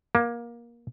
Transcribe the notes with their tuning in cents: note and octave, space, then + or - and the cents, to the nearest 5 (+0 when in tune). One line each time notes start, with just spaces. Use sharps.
A#3 +20